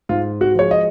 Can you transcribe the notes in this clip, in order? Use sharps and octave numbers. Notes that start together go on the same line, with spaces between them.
G#2 F4
F#4
F3 G#3 C#5
D#5